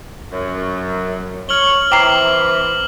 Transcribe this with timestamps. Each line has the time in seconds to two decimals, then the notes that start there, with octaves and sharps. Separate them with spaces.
0.31 F#2
1.49 C#5 F6 F#7 G7
1.92 E3 C4 E4 G5 A#5 D6 C7